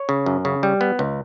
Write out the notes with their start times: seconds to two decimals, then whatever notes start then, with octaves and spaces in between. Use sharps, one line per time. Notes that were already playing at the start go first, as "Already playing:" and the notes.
Already playing: C#5
0.09 C#3
0.26 F#2
0.45 C#3
0.63 G3
0.81 B3
0.99 C#2